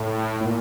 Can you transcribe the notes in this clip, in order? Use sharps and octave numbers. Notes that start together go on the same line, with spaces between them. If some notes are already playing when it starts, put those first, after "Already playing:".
Already playing: A2
A2
A#2